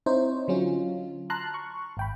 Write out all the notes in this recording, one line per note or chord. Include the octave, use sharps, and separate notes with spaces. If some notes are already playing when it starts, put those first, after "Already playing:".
C4 D#4 E4 C5 C#5
D3 F#3 C#4 F4
A5 A#5 C6 F6 F#6
C#6
G#1 G5 B5